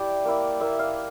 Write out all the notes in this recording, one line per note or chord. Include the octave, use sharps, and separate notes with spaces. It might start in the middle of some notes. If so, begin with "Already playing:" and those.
Already playing: E4 G4 D5
A#3 E4
A#3 E4 E5
F5